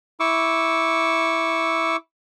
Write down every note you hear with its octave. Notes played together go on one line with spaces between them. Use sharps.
E4 C#6 D6 E6